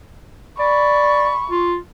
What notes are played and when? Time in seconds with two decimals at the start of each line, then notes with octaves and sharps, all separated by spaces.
0.59 D5 B5 C#6
1.51 F4